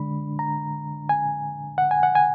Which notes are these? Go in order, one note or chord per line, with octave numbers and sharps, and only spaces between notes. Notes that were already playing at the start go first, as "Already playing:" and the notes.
Already playing: D3 G#3 D4 B5
A#5
G#5
F#5
G#5
F#5
G#5